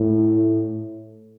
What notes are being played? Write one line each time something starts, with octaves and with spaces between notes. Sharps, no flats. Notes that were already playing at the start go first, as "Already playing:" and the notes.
Already playing: A2